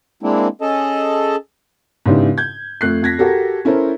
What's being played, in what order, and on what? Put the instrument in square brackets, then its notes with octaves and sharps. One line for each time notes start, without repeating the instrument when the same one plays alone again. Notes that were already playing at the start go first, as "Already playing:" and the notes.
[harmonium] G#3 A#3 C4 D4 E4
C#4 G#4 A4 D#5 A5
[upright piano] G#2 C#3 B3 D4 E4 G4
G6 G#6
F2 A3 F#6 C7
F2 G#6 A#6 B6
F#4 G4 A4 A#4
C#4 E4 A4 A#4 C5